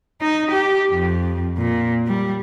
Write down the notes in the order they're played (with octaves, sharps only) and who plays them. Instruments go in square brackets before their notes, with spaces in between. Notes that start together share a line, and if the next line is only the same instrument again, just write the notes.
[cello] D#4
G4
F2
A#2
G3